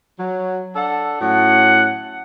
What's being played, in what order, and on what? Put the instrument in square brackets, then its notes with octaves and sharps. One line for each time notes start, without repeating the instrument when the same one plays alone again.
[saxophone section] F#3
D4 A4 F#5
[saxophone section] A2 F#3 C#4 [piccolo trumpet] F#5